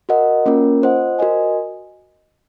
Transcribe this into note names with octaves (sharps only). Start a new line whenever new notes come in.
F#4 A#4 D#5 F#5
A#3 C#4 F4 A#4
F4 C5 D#5 F#5
F#4 A#4 D#5 G#5